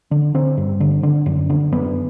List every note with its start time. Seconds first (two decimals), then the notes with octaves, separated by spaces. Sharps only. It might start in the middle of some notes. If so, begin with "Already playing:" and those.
0.11 D3
0.34 D3 C4
0.57 G2
0.80 D3
1.03 D3
1.26 F#2
1.50 D3
1.72 F#2 B3